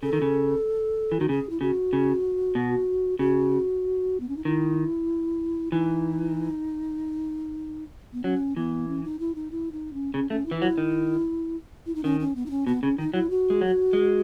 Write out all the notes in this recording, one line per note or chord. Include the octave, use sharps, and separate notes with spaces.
C#3 A4
D#3
C#3
E3
D#3 F#4
C#3 G#4
E4
C#3 F#4
C#3
B2
C#3 F#4
B3
C#4
D#4
D#3 E4
E3 D#4
B3
F#3 C#4
E3 B3
C#4
D#4
E4
D#4
E4
D#4
C#4
C#3 C#4
A3 C#4
E4
E3
F#3 E4
D#3
E4
D#4
D#3 C#4
C#4
B3
D#4
C#4
B2 B3
C#3 C#4
D#3 D#4
F#3 E4
F#4
G#3
F#3
G#3